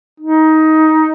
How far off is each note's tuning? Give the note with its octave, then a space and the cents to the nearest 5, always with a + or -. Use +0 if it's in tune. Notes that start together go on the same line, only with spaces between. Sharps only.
D#4 +15